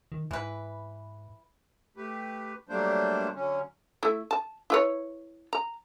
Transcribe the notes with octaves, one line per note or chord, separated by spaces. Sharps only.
D#3
G#2 E3 B4
A3 G4 B4
F#3 G3 A3 A#3 D4 C5
D3 F#3 C#4
A3 E4
A5
E4 B4 C#5
A#5